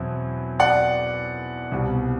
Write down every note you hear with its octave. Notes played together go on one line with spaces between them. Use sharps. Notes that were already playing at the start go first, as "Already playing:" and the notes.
Already playing: E2 B2 F#3 C4 E4
D5 F#5
C2 B2 G3